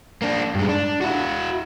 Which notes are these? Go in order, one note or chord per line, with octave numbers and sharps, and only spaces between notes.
A#3 D4
G2 G#3
D4
E4 F#4